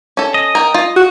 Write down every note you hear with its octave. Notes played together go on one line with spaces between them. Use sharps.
C#4 A4
D#5
A#4 G5
F4
F#4